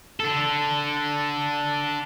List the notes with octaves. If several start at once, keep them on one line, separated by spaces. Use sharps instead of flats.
D4 A4